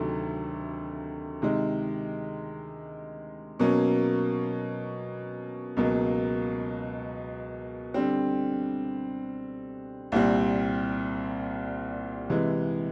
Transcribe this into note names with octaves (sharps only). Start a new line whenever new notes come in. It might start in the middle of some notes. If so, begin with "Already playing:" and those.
Already playing: D2 C3 D#3 F#3 A3
C3 D#3 G#3
B2 F#3 A#3 C#4
C#2 B2 F#3 A#3
D3 G3 C4
C2 A#2 G3 C4
C3 E3 G#3